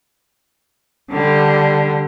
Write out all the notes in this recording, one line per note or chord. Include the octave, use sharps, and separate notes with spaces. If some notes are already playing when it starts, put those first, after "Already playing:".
D3 G3